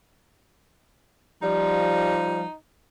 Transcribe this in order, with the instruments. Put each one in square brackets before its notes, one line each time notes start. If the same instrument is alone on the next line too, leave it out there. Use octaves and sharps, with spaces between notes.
[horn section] F3 G3 [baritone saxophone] D#4